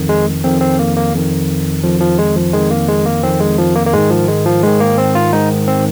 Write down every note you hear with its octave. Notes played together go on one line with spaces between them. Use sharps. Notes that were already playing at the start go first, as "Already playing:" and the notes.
Already playing: F2 D#3
G#3
F2 D#3 C4
C4
A#3
A#3
F2 D#3
F2 D#3 F3
F3
G#3
F3
F2 D#3 G#3
A#3
G#3
A#3
F2 D#3 C4
G#3
F3
A#3
A#3
G#2 D#3 G#3
F3
G#3
F3
G#2 D#3 G#3
A#3
C4
F4
G#2 D#3 D#4
C4